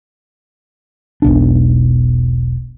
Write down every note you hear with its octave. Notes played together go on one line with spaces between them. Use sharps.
E1 B1 D4